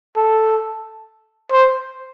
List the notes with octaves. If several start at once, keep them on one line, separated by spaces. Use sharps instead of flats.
A4
C5